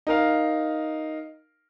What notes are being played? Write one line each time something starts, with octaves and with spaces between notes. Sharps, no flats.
D#4 A#4 F5